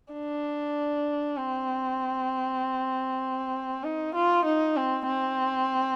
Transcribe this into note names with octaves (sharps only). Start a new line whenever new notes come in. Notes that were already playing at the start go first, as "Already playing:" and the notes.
D4
C4
D#4
F4
D#4
C4
C4